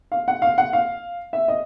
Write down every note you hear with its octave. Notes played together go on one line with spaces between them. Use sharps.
F5
F#5
F5
F#5
F5
E5
D#5